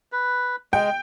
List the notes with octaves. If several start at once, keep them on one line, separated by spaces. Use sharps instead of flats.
B4
G#3 G5